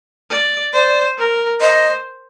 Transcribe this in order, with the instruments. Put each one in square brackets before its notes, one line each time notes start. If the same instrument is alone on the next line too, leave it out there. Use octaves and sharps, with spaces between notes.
[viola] D5
[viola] C5 [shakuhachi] D5
[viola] A#4
[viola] C5 [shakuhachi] D#5